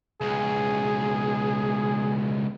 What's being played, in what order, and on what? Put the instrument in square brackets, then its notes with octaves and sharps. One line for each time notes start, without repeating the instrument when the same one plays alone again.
[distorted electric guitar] C#2 B2 [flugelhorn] G#4